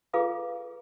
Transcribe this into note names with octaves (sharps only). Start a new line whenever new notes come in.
F4 G#4 A4 B4 F5 D6